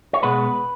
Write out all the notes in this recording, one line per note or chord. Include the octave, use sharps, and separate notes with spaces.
C#5
B2 G#3 B3 B4